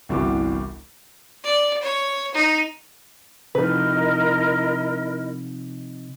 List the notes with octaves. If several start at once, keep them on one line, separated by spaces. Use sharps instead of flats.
G1 C2 E3 F#4 D6
D5
C#5
D#4
C3 F3 D#4 E4 A#4 B4 D#5